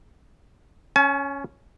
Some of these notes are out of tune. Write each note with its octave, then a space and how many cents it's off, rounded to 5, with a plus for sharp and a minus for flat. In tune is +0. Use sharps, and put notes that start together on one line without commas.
C#4 +0 G#5 +45